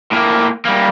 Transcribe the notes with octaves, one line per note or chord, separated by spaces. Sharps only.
A2 A#3
G3 A#3